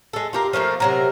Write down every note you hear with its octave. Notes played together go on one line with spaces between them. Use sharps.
G#3 A4
F4 G4 A#4
F3 A3 A#3 F4
C3 F#3 A#4